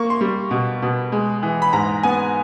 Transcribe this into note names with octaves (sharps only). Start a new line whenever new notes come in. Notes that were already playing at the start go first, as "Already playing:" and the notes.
Already playing: A#3 C#6
C6
G3
B2
B2
G#3
E3
B5
G#2 A#5
B3 G#5